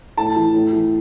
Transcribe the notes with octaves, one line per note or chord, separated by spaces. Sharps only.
A2 A5
E3
A2
E3